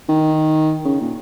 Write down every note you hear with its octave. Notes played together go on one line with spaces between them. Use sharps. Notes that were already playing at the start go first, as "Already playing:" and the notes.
D#3
C#3
A#2